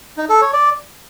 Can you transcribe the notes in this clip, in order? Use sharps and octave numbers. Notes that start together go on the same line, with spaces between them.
D#4
A4
C#5
D5